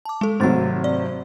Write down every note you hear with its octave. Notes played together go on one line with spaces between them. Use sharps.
A5 D6
G#3 A4
G#1 C3 F#3 A3 A6
D5